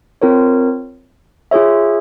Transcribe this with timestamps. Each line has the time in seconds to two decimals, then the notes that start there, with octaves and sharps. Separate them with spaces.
0.22 C4 F4 A#4 C#5
1.51 F4 G#4 C#5 E5